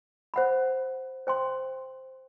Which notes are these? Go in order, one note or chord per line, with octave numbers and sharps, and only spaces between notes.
C5 F#5 B5
C5 G5 C6